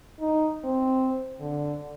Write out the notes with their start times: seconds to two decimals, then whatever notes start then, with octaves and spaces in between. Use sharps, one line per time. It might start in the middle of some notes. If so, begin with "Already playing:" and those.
0.20 D#4
0.64 C4
1.40 D3